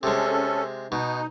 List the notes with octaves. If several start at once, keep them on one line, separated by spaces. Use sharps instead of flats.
C3 G#3 C#4 A4
B2 D#4